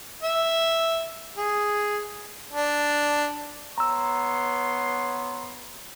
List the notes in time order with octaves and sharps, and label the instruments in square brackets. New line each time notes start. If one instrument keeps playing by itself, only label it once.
[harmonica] E5
G#4
D4
[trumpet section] B3 C#5 C6 [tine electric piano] A#5 E6